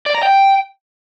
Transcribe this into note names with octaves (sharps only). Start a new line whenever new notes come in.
D5
A#5
G5